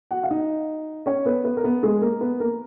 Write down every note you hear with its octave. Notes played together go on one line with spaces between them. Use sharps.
F#4 F#5
F5
D#4 D#5
C#4 C#5
B3 B4
B3 B4
A#4
B3 B4
G#3 G#4
A#3 A#4
B3 B4
A#3 A#4